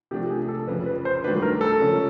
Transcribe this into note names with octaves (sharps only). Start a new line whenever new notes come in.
C3 F3 A3 D4 G4
G#4
A4
F2 C#3 F3 B4
B4
C5
G2 D#3 F#3 A3 D4 B4
A#4
A4
C#3 F3 G#3 C#4